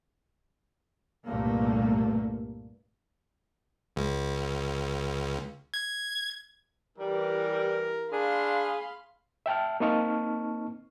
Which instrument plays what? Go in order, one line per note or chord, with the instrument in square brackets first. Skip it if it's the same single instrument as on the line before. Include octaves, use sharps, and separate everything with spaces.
[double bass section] C2 G2 A#2 A3 A#3
[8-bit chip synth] C#2
G#6
[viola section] E3 G4 [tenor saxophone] G3 [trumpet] A#4
[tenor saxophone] D4 [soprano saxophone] G#4 [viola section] F5 B5 C6
[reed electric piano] E5 G5 A5 F6
A#3 C4 D#4 A5 C#6 F6